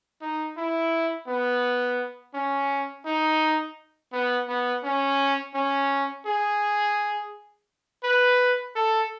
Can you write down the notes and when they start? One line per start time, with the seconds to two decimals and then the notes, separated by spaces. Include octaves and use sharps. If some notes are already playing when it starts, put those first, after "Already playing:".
0.22 D#4
0.57 E4
1.28 B3
2.35 C#4
3.06 D#4
4.13 B3
4.48 B3
4.84 C#4
5.55 C#4
6.27 G#4
8.04 B4
8.76 A4